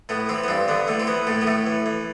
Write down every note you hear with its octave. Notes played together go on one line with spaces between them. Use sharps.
A2 B3
E3 C4
B3
G2 C4
D3 B3
E3 A3
C4
E3 B3
A2 A3
B3
A2 A3
E3
E3